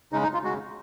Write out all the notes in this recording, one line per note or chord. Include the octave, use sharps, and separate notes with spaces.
C#3 G#3 D#4
D#4
F4
C#3 G#3 F#4